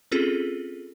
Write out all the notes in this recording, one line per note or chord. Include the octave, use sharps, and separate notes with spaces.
C4 C#4 F4 G#4 A4